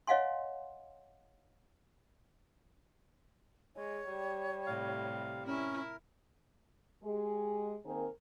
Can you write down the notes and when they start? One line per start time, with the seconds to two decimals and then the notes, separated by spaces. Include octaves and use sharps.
0.07 C#5 D#5 F5 F#5 G#5 C6
3.76 G#3 C#5
4.07 G3
4.66 A2 C3 F5
5.47 C#4 E4 A#4
7.04 G#3 G4 G#4
7.85 D#3 A#3 C4 G#4 A#4 C5